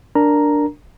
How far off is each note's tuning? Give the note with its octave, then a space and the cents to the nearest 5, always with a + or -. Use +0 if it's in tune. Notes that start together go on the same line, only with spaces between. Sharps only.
D4 +0 A#4 +0 A#5 +0